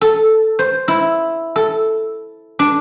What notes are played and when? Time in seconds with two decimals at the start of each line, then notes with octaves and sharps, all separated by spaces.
0.01 A4
0.59 C5
0.88 E4
1.56 A4
2.59 D4